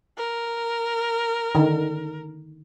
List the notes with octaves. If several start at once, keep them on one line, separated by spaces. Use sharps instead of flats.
A#4
D3 D#3